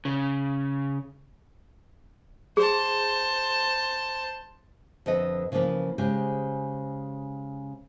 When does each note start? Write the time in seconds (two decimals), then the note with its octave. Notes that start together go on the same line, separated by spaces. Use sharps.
0.05 C#3
2.57 G#4 C5 A5
5.06 F2 D3 A4 B4 D#5
5.52 C#3 E3 F3 A#3 B4
5.98 C#3 G#3 G4 C5